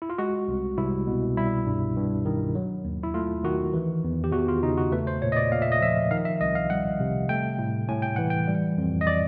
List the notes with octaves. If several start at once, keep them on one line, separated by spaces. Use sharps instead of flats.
E4
F4
G#3 F#4
C2
C2 E4
B2
G3 E4
G2
G2
D#3
F#3
D#2
E4
A3 F4
D#3 F#4
E3
E2
G4
E2 F#4
F4
C#3 D#4
F#4
A3 B4
C5
A#2 C#5
D#5
D5
A#2 F5
E5
D#5
F3 E5
D#3 F5
E5
C2 D#5
F5
G3 F#5
C3
A3 G5
A2
A2 G#5
G5
E3 F#5
G5
G3
F2
D#5
D5